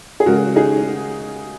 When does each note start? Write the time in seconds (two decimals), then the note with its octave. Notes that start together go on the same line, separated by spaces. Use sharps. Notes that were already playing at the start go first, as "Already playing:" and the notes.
0.20 G#4
0.26 C#3 G#3 F#4 A#4
0.56 D#4 G#4